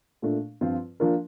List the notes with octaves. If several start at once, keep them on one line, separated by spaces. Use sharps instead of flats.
A#2 A3 D4
G2 F3 C4 F4
F3 A#3 D4 F4 A#4